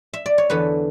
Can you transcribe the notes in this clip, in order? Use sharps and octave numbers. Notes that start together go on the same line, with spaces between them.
E5
D5
C#5
E2 D3 A3 B3 B4